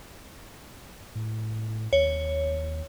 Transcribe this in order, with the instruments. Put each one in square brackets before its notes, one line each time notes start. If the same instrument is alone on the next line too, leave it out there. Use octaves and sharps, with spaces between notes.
[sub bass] A2
[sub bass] D#2 [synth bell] C#5